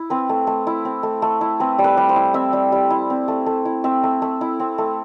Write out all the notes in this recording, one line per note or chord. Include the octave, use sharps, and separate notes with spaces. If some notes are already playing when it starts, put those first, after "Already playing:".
Already playing: E4
C4 B4
A3
A3
E4
C4
A3
A3
E4
C4 B4
G3
B4
G3
C5
E4
C4 E5
G3
G3
E4
C4
A3
A3
E4
C4 E5
A3
A3
E4
C4
A3